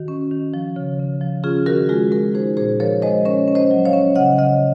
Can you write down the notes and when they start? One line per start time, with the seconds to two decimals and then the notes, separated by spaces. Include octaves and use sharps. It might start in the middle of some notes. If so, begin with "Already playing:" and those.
Already playing: D#3 F#4
0.08 C#4
0.31 D#3
0.54 F3
0.76 C#3
0.99 C#3
1.21 F3
1.44 C#4 F4 G#4
1.66 D#3 F#4 A#4
1.89 G#3 F4 G#4
2.12 G#3 F#4 A#4
2.34 D#4 G#4 C5
2.57 A#2 G#4 C5
2.80 F3 A#4 C#5
3.02 G#3 C5 D#5
3.25 C#4 A#4 C#5
3.48 C#4
3.55 C5 D#5
3.71 F#3
3.85 C#5 F5
3.93 C#4
4.16 C#3 D#5 F#5
4.38 C#3 D#5 F#5